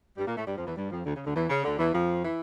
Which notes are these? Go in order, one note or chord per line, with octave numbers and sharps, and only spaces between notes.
G2 G3
A#2 A#3
A2 A3
G2 G3
F2 F3
E2 E3
G2 G3
F2 F3
D2 D3
C#3
D2 D3
E2 E3
C#3
D2 D3
E2 E3
F2 F3
E3